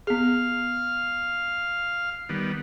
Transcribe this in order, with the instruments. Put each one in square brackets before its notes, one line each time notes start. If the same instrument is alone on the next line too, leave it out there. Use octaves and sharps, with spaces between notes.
[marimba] B3 G#4 [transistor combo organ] F5 F6
[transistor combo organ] D#3 G3 B3